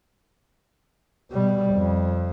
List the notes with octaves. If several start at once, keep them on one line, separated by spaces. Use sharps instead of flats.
B2 G3
F2